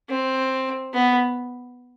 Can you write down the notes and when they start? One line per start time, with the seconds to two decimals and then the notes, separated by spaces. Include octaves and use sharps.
0.09 C4
0.94 B3